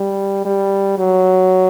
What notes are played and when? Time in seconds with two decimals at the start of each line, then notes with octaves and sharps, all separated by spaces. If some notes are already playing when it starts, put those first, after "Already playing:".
Already playing: G3
0.45 G3
0.98 F#3